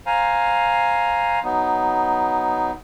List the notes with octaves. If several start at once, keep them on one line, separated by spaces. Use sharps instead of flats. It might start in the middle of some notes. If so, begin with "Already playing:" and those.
C5 F5 G#5 A#5
F#3 B3 D#4